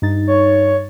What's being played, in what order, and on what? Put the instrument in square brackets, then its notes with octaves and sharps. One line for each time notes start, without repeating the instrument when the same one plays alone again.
[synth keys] G2 D#4 A6
[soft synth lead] C#5